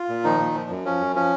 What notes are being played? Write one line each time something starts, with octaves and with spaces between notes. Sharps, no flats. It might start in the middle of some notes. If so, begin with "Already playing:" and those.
Already playing: F4
A#2
D#3 F3 D#4
A#2
F3
F#2
F3 C#4
F#2
F3 C#4